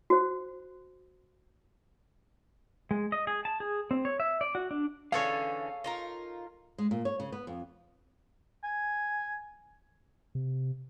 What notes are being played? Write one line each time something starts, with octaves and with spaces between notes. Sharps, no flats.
F#4 C5
G#3
D#5
G#4
A5
G#4
C4
C#5
E5
D5
F#4
D4
D3 E3 C#4 G#4 A4 C#5 F5
D#4 F4 A#4
G#3
A#2
C#5
C#3
B3
F2
G#5
C3